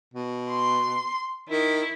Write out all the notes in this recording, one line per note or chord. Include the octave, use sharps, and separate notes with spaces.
B2
C6
D#3 E4